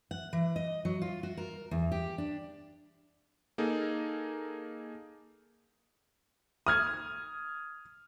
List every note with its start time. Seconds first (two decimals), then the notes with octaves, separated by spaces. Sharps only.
0.11 F#5
0.33 E3
0.56 D#5
0.85 F#3
1.02 F4
1.23 F#4
1.37 A#4
1.71 E2
1.92 G4
2.18 D4
3.58 A#3 D#4 G#4 A4
6.67 D#6 F6 G#6